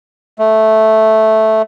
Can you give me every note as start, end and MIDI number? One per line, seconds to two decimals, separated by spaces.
0.39 1.62 57